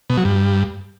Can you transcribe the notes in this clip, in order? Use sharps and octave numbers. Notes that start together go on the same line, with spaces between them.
B2
F#3
G2